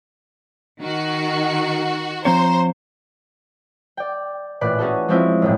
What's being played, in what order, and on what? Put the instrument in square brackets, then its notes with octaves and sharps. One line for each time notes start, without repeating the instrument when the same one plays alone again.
[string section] D#3 F#4
[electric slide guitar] F3 C4 C#5 [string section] C5 [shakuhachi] A#5
[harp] D5 G5
A1 A#2 B4 D5 F#6
C#4 F#4 G#4 A4
F3 G#3 C4 C#4 E4 F4
F#1 B1 A2